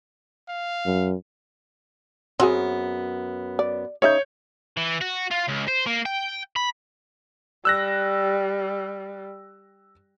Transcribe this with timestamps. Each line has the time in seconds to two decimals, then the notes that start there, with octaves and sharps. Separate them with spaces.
0.48 F5
0.86 F#2
2.40 F#2 B3 C4 F#4 G#4
3.59 D5
4.02 C#3 D#4 C#5 E5 G6
4.77 E3
5.01 F#4
5.31 F4
5.48 C#2
5.68 C5
5.86 A#3
6.05 G5
6.56 B5
7.65 G3 E6 F#6 A#6